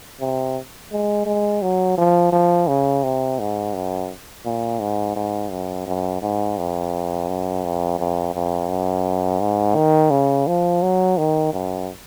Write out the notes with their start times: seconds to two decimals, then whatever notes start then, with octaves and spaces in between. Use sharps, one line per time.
0.21 C3
0.92 G#3
1.26 G#3
1.62 F#3
1.97 F3
2.32 F3
2.67 C#3
3.03 C3
3.39 G#2
3.74 F#2
4.45 A#2
4.80 G#2
5.16 G#2
5.51 F#2
5.87 F#2
6.22 G#2
6.58 F2
7.29 F#2
7.64 F2
7.99 F2
8.35 F2
8.69 F#2
9.40 G#2
9.76 D#3
10.11 C#3
10.47 F3
10.82 F#3
11.17 D#3
11.53 F#2